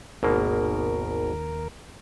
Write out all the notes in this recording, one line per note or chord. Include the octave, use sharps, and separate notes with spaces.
G#1 D#2 B2 A#3 A#4